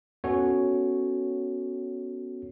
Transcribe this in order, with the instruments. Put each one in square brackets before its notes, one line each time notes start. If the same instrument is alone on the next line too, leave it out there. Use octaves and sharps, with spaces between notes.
[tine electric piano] B3 C#4 F#4 A4 C#5